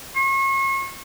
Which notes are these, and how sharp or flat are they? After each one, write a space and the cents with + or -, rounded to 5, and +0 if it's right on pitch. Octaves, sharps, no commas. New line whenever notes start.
C#6 -40